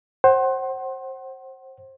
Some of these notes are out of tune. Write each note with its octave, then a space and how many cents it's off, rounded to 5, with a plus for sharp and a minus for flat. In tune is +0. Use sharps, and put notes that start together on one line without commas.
C5 +25 F#5 +30